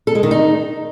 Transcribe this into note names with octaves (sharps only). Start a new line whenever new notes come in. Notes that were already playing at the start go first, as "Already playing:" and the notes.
A4
G#3
D#3
D#4